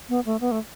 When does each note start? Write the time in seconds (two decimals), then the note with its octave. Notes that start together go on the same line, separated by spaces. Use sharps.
0.09 B3
0.25 A3
0.41 B3
0.52 A3